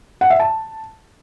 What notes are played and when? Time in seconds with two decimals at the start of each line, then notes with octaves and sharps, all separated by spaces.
0.21 F#5
0.30 E5
0.40 A5